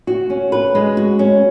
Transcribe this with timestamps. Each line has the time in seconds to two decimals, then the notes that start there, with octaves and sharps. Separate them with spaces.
0.07 F#4
0.30 C#4
0.52 B4
0.75 G#3
0.97 F#4
1.19 C#4